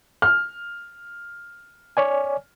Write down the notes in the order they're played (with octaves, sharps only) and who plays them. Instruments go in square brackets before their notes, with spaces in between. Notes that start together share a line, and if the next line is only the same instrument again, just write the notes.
[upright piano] F6
[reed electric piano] C#5 D5 G#5